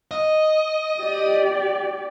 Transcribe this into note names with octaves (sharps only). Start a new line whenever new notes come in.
D#5
G4 D5